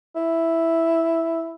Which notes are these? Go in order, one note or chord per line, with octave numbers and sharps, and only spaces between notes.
E4